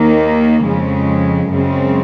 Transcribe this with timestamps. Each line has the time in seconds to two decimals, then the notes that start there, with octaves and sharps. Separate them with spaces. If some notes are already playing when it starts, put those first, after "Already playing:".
Already playing: D#2 D#3 A#3
0.63 F2 C#3 G#3
1.49 F#2 C#3 G#3 C4